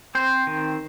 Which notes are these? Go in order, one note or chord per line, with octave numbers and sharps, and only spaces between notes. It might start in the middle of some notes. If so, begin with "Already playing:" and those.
C4 C5
D#3